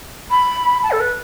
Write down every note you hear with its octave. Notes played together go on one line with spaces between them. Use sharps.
B5
A5
A4
B4